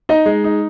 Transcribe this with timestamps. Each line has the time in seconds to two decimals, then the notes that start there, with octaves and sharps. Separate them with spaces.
0.09 D#4 D#5
0.26 G#3
0.44 D#4